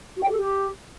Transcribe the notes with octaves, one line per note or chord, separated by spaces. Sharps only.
F#4
G5
G4
A4
G4